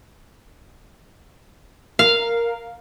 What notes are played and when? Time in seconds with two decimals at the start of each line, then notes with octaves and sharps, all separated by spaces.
1.99 A#4 F5